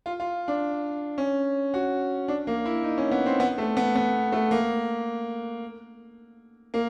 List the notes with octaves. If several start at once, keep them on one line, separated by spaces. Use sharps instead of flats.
F4
F4
D4
C#4
F#4
D4
A#3
E4
D#4
C#4
B3
C4
B3
A3
B3
B3
A3
A#3
A#3